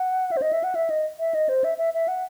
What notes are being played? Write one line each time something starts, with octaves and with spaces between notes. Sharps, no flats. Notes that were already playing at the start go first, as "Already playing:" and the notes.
Already playing: F#5
E5
C5
D#5
E5
F#5
E5
D#5
E5
D#5
C5
E5
E5
E5
F#5